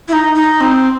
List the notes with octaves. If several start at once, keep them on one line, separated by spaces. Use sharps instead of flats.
E4
D#4
D#4
C4